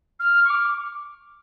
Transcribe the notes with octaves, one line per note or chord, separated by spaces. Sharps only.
F6
C#6
D6